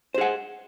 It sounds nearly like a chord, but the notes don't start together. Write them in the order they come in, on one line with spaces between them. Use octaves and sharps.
C5 G#4 F#5